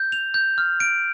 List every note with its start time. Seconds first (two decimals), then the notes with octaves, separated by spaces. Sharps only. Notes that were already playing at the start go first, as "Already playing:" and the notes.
Already playing: G6
0.12 F7
0.34 G6
0.58 F6
0.80 D7